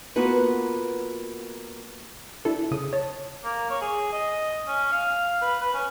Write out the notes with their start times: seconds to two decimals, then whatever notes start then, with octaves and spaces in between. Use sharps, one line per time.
0.16 A#3 B3 F4 F#4 B4
2.45 D4 E4 A4
2.71 C#3 D#6
2.93 C#5 A5
3.44 A#3
3.70 C#5
3.82 G#4
4.12 D#5
4.68 C#4
4.92 F5
5.42 B4
5.60 B4
5.74 C#4